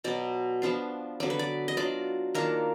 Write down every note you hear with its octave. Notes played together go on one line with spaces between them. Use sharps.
B2 F#3 B3 D5
F3 B3 D4 F4
D3 F#3 B3 D5
B4
D5
D#5
F#3 D4 F4 D5
D#3 A#3 D4 F4 A#4